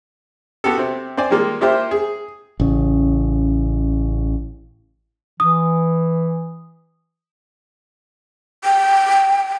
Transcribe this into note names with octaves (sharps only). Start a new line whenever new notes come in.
B3 F#4 G4 A4
C3 C4
C4 C5 D5 G#5
D#3 G3 G#3 A#3 F4
A#3 E4 F4 G4 C5
G#4
A1 C#3
E3 D#6
G5